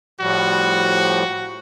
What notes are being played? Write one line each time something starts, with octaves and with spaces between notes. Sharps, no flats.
A2 F3 G3 F#4